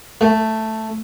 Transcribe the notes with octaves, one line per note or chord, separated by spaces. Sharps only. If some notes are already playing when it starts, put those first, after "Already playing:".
A3